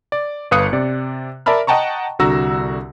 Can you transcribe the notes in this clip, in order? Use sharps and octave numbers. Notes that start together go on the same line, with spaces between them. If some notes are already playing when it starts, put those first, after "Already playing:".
D5
G1 B4 F5 D#6 F#6 C#7
C3 D5
A#4 D5 E5 A5 B5 F6
D#5 F#5 G5 A5 A#5 C#6
C2 D3 F#4 A#5 E6 A#6